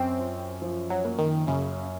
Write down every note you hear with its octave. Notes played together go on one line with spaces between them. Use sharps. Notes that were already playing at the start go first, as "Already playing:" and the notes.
Already playing: F#2 C4
F4
F3
F#3
A#3
D#3
F#2 C#3